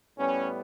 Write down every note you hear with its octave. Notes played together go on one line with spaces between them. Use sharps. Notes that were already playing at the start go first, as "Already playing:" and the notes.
A2 G3 B3 C#4